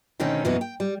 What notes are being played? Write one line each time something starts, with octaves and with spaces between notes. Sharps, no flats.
B2 D3 D#3 A3 C4 C#4
F#2 B2 E3 A#3 B3 F#4
G5
G3